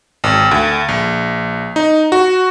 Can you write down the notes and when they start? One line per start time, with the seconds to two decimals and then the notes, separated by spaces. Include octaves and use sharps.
0.24 G#1
0.51 D2
0.89 A#1
1.76 D#4
2.12 F#4